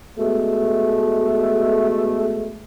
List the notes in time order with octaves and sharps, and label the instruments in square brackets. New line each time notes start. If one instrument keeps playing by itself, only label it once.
[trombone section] B2 G#3 A3